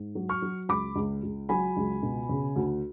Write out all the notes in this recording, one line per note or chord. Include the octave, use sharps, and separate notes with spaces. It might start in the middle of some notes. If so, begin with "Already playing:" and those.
Already playing: G#2
F#3
C#6 F6
F#3
C#2 B5 D6
C#2
C#2
F#3 G#5 B5
C#2
B2
C#3
D2